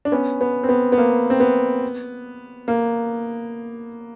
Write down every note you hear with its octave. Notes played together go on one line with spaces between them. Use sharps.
D4
B3 C#4
B3
C4
B3
B3
A#3
C4
B3
A#3